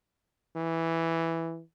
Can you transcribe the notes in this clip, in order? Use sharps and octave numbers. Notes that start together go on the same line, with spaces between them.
E3